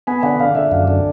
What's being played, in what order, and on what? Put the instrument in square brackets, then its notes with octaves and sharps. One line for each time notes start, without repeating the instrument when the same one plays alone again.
[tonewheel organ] B3 [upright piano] G#5
[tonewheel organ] D3 [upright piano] F#5
[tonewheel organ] D3 [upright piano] F5
[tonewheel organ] D3 [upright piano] E5
[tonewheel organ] F#2 [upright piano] F5
[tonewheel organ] D3